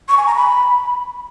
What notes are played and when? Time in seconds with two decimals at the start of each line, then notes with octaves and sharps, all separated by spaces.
0.09 C#6
0.17 G#5
0.26 A#5
0.35 B5